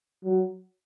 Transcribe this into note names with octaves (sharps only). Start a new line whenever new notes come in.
F#3